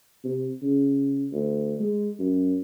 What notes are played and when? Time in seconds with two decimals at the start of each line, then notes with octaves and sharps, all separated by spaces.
0.24 C3
0.62 C#3
1.32 D2
1.80 G#3
2.19 F#2